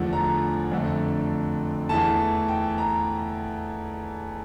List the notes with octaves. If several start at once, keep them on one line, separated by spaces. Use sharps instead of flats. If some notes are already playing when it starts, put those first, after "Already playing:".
Already playing: E2 D3 F3 A3
A#5
F2 D3 A3
E2 E3 A3 A5
G5
A#5